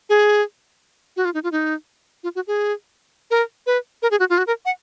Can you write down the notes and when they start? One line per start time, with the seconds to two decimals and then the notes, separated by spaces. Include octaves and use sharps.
0.09 G#4
1.17 F#4
1.25 F4
1.34 D#4
1.44 F4
1.52 D#4
2.24 F4
2.35 F#4
2.47 G#4
3.31 A#4
3.67 B4
4.02 A#4
4.11 G#4
4.20 F#4
4.30 F4
4.38 F#4
4.47 A#4
4.65 F#5